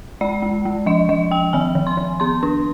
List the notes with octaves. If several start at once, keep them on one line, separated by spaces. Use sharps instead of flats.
G#3 D5
G#3
G#3
F3 D#5
F3 D#5
F3 G5
D#3 G#5
D#3
C6
D#3
B3 C6
D4